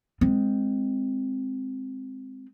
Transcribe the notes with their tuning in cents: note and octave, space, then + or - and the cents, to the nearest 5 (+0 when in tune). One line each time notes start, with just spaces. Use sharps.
G#3 +0 C4 +0